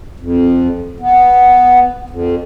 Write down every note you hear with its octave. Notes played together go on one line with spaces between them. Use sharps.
F2
B3
F2